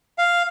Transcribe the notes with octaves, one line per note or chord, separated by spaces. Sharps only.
F5